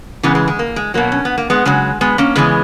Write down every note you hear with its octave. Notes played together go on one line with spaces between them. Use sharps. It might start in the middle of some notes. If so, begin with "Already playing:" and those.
C#3 E3 G#3 B3
G#3
G#3
A#3
G#3
B2 F#3 A#3
C#4
B3
A#3
G#3 B3
C#3 F#3 G#3
G#3 B3
A#3 C#4
C#3 E3 G#3 B3